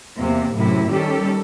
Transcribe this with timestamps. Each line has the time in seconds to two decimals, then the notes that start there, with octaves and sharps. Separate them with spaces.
0.18 E2 C3 A#3
0.55 F#2 A2 C3 E4
0.90 D#3 G3 C#4 G4 A4